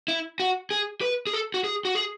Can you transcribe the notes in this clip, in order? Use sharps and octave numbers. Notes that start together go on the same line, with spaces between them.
E4
F#4
G#4
B4
G#4
A4
F#4
G#4
F#4
G#4